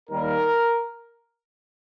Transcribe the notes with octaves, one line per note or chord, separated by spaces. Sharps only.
D#2 D#3 G3 A#3 A#4